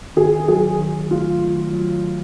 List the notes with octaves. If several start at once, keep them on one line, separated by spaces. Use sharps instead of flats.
D#3 G#4
F#3 G#4
D#3
A3 F4
D#3
F#3